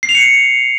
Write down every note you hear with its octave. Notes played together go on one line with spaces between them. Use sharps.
C7
F7
C#7